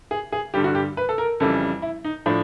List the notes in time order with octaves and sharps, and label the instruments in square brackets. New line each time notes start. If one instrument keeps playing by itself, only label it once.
[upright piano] G#4
G#4
G2 D3 G3 G4
F#4
G4
B4
A4
A#4
F2 C#3 E3 G3 A4
E4
D#4
A2 F3 D4